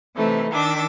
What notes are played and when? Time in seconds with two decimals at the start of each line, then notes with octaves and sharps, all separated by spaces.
0.16 C3 E3 A3 D#4
0.52 D#3 D4 D6 E6